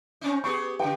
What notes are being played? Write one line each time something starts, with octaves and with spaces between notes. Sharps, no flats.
C4 C#4 D#4
B3 G4 G#4 C#6
C#3 G3 B4 G5